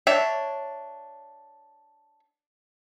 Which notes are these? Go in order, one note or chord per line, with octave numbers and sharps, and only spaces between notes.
D4 C#5 E5